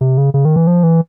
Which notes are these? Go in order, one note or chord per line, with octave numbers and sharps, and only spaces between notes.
C3
C#3
C#3
D#3
E3
F3
E3